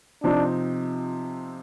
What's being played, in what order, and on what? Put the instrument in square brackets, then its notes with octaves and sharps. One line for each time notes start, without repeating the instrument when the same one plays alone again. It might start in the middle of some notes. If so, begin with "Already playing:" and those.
[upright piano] C3 F3 C4 D#4 [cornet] D4